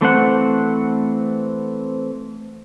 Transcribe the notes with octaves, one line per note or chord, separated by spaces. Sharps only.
E3 A3 C4 F#5